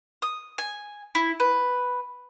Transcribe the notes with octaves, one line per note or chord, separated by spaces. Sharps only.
D#6
G#5
E4
B4